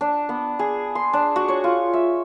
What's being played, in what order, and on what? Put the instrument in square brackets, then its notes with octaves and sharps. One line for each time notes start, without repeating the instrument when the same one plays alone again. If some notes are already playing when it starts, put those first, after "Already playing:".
[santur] D4
B3
G#4
C6
D4
F#4
C#5
F4
E5